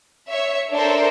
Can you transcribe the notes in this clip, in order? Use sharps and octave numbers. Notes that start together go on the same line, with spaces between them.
C#5 E5
D4 A4 A#4 C5 E5